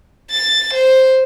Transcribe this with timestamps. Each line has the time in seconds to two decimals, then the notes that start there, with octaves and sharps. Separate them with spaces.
0.31 A6
0.74 C5